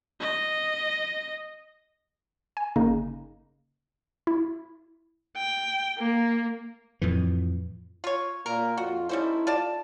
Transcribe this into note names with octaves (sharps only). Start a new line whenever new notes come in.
D#5
G#5
G1 C#3 A#3 D#4
E4
G5
A#3
F2 A2 E3
F4 C#5
A#2 A#4
F2 F4 F#4
G3 A3 C#4 D#4 E4 C5
F4 D5 A5